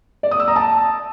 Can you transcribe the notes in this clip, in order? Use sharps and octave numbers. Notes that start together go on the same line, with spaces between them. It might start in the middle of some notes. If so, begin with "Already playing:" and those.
D5
D#6
E6
A#5
A5